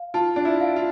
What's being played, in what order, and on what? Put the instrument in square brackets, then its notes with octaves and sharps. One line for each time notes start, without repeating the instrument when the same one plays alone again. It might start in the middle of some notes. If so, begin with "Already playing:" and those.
Already playing: [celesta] F5
[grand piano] F4 [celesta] A5
[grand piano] D4
E4
[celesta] F5
[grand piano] F4